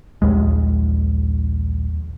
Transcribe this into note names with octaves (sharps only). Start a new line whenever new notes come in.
A#1 D#2 G#3